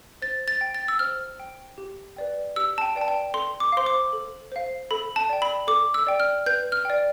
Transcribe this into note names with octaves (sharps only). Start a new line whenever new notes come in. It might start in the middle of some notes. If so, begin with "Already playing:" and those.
C5 A6
A6
G5
A6
E6
C5 F6
G5
G4
B4 D5 G5
G4 E6
A5
G5
B4 D5 G5
A5
G5
A4 C6
D6
C5 F5 C6
D6
A4
C5 F5
A4 B5
A5
D5 G5
B5
A4 D6
E6
D5 G5
F6
B4 G6
F6
D5 G5